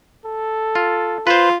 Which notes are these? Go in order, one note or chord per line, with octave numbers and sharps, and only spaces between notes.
A4
F4
F4 B4 C5